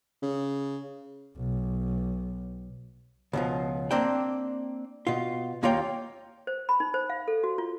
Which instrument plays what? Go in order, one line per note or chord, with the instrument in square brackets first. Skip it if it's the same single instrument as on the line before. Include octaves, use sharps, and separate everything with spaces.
[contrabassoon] C#3
[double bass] B1
[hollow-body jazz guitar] C#2 B2 F3
A#3 C4 D4 G5
B2 F4
D#2 A#3 F4 C#5 F5 G5
[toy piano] C5
B5
D#4
C5
F5
A4
F#4
F4